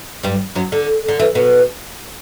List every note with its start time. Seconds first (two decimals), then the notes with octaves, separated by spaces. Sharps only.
0.23 G2 G3
0.55 F#2 F#3
0.72 D3
1.08 D3
1.19 E3
1.35 B2 B3